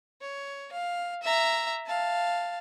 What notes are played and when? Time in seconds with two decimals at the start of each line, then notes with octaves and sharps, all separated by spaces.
0.21 C#5
0.72 F5
1.23 E5 A#5
1.87 F5 A5